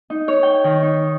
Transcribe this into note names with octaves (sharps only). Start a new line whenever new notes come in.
D#4
C#5
G5
D#3
D#4